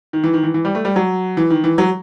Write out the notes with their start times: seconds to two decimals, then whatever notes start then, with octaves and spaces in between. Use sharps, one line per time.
0.13 D#3
0.24 E3
0.34 D#3
0.43 E3
0.54 E3
0.65 G3
0.75 A3
0.85 G3
0.96 F#3
1.37 E3
1.50 D#3
1.64 E3
1.78 F#3